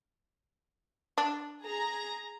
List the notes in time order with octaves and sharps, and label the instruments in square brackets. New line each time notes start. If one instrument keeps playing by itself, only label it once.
[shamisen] D4
[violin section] G#4 A#5